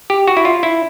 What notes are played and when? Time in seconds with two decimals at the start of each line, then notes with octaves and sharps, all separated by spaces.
0.10 G4
0.28 F#4
0.37 E4
0.45 F4
0.63 E4